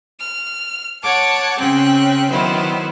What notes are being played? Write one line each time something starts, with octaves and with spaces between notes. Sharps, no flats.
F6
C#5 F#5 A5 D6
C#3 C4 C#4 G5 F#6
D#3 F#3 B3 E4 C5